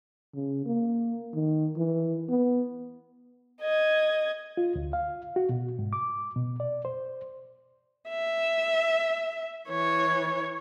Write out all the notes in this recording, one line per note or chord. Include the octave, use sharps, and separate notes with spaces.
C#3
A#3
D#3
E3
B3
D#5 G#6
F4
D2
F5
F#4
B2
G#2
D6
B2
D5
C5
E5
E3 C#5